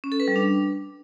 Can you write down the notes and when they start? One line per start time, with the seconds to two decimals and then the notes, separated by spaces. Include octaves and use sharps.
0.04 C#4
0.12 A4
0.20 B4
0.28 G3
0.36 D4